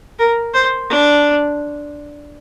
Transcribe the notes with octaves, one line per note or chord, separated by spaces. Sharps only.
A#4
C5
D4